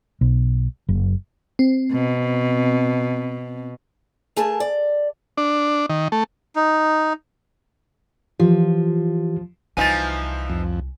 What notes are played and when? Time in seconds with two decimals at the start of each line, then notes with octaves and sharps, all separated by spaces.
0.21 B1
0.89 F#1
1.59 C4
1.90 B2
4.37 A3 G#4 A#4 A5
4.60 D5
5.37 D4
5.89 D#3
6.12 A3
6.56 D#4
8.40 E3 F3 F4 G4
9.77 C2 E3 F3 D#4 G#5 A6
10.50 F2